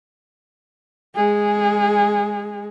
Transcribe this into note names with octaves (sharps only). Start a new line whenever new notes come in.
G#3 G#4